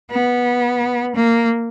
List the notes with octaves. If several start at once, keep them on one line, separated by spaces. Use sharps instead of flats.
B3
A#3